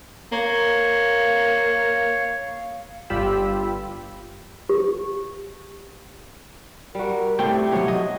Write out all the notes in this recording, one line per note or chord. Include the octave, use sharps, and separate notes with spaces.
A#3 C#5 F5
G1 G2 F4 G4 B5 E6
G4
G3 F#4 A#4
A3 C4 E4 G4 C5 G5
B1 F#3 F#4 C#5
D#5